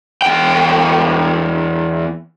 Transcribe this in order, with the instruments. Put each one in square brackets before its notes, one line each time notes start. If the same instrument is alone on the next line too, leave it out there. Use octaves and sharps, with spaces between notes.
[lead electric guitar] E2 G5